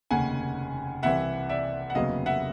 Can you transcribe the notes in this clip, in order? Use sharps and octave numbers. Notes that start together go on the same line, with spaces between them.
F1 D#2 C#3 F#5 G#5
C2 C3 E3 E5 F#5
D5 E5
F#5
F1 D#2 C#3 F#3 B3 D#5 F5
E5 F#5